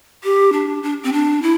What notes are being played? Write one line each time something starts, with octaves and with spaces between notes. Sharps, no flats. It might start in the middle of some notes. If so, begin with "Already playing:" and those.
G4
D4
D4
C4
D4
E4